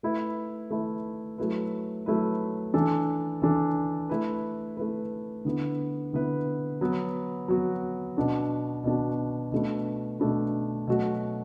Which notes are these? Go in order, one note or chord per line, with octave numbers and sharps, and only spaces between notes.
A3 E4 B4
A3 E4 B4
F#3 A3 E4 B4
F#3 A3 E4 B4
E3 D4 A4
E3 D4 A4
A3 E4 B4
A3 E4 B4
D3 B3 E4 B4
D3 B3 E4 B4
F#3 B3 F#4
F#3 B3 F#4
B2 B3 D4 F#4
B2 B3 D4 F#4
B2 A3 D4 B4
B2 A3 D4 B4
B2 F#3 A3 F#4